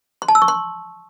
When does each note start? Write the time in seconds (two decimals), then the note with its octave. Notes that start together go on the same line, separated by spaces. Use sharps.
0.22 C6
0.28 A5
0.35 E6
0.42 C#6
0.48 C6